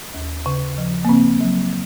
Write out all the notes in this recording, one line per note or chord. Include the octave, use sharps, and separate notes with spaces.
D#2
C#3
F3
A#3
C#3 C4
F#3